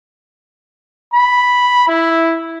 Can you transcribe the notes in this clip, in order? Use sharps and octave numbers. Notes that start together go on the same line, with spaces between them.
B5
E4